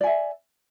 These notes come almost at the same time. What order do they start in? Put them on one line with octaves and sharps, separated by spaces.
D5 G#5 E5